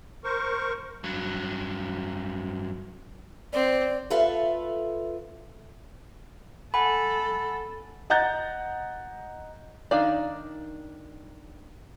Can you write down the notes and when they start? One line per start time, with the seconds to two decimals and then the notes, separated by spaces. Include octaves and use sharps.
0.24 A#4 C5 C#6
1.04 G2 F#3
3.53 C4 D5
4.10 F4 A4 B4 E5 F5
6.74 A4 F#5 G#5 B5
8.10 D#5 F#5 A#5 F#6 G6 A6
9.91 D#3 D4 D#4 D5 F5